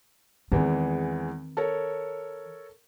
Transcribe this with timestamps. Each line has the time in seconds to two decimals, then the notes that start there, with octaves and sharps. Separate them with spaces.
0.52 E2 D#3 E3 G#3 C4
1.57 A4 A#4 C#5